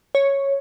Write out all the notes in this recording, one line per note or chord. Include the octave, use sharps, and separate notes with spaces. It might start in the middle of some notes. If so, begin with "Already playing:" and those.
C#5